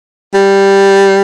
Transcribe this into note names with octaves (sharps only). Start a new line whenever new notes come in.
G3